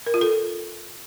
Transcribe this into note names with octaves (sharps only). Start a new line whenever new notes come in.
A#4
F4
A4